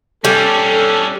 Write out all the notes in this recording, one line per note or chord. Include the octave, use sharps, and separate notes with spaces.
G3 C#4 D4 A4